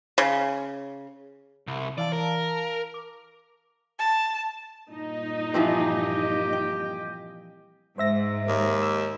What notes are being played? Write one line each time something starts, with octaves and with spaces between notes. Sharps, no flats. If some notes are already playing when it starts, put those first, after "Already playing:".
C#3
C2
E3 D5 F5 A5
A#4
D6
A5
G2 A#2 D#4 D#5
E3 F3 C4 G4
G5
G#2 C5 E5 A#6
D#2
E6